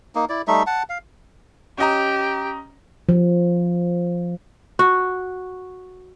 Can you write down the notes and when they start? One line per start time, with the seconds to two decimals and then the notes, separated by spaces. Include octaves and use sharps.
0.15 A#3 D#4
0.29 E4 D5
0.48 G3 A3 D#4 E5
0.67 F#5 A5
0.89 F5
1.78 C#4 G4 D#5 A#5
3.09 F3
4.79 F#4